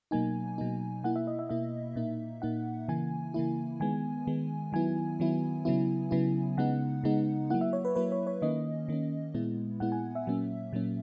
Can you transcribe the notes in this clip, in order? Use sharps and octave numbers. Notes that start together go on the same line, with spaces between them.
B2 F#3 A#3 D#4 G#5
B2 F#3 A#3 D#4
B2 A#3 E4 F#5
E5
D#5
E5
B2 A#3 E4 E5
A#2 A#3 D#4
A#2 A#3 D#4 F#5
C#3 E3 A#3 E4 G#5
C#3 E3 A#3 E4
D#3 G#3 B3 G#5
D#3 G#3 B3
D#3 F#3 B3 E4 G#5
D#3 F#3 B3 E4
C#3 F#3 B3 E4
C#3 F#3 B3 E4
C#3 G#3 B3 D#4 F#5
C#3 G#3 B3 D#4
F#3 A#3 E4 F#5
E5
C#5
B4
F#3 A#3 E4 B4
C#5
C#5
D#3 A#3 C#4 D#5
D#3 A#3 C#4
A#2 G#3 B3 E4
A#2 G#3 B3 E4 F#5
G#5
E5
A#2 F#3 A#3 C#4
A#2 F#3 A#3 C#4